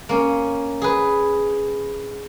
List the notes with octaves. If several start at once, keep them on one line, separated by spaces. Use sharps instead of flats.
A#3 C#4
G#4 B4